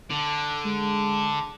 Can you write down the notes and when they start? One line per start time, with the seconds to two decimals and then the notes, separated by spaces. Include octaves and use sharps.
0.10 D3
0.65 G#3